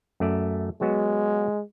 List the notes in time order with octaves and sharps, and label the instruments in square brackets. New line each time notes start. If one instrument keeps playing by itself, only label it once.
[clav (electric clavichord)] F#2 A3 D5
[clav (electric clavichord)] F#3 B3 F#4 [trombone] G#3